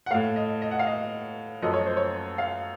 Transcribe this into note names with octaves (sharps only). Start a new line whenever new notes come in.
F#5
A2 A3 F5
D#5
D#5
F#5
F5
D#5
F#2 F3 A3 D#5
C#5
C5
C#5
F5